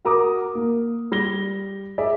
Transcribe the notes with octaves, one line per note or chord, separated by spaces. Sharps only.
F#4 A#4 A#5 D6 D#6
A#3
G3 A#6 G7
G#4 D5 E5